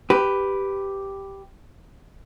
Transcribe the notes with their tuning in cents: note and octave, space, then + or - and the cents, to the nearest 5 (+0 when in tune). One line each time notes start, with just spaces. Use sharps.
G4 +0 B4 +5